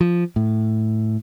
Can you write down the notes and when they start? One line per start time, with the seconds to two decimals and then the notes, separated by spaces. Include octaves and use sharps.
0.01 F3
0.36 A2